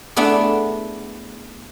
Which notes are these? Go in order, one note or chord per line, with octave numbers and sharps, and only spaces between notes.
A3 B3 D4 E4 G#4